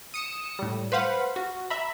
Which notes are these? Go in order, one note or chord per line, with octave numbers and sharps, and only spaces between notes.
D#6 C#7 E7
A2 G3
B4 C5 F5 F#5 B5
F#4
E5 A#5 B5